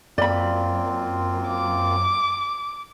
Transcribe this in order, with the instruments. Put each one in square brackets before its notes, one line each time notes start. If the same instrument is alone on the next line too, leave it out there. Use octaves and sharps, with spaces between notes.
[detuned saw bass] F#2 [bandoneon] A#3 C4 F4 [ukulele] D5 B5
[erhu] D6